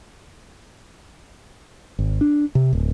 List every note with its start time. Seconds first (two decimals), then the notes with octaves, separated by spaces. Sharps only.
1.99 G#1
2.21 D4
2.55 C3
2.73 D1